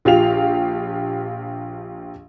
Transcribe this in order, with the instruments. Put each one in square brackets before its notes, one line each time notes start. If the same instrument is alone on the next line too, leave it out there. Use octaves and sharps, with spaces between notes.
[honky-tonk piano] A#1 F4 G4 F5 F7